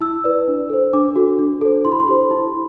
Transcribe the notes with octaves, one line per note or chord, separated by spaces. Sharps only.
E4 E6
B4 D5
D4
A4 C5
D4 D6
F#4 A4
D4
A4 C5
E4 C6
B5
C6
G4 C5
E4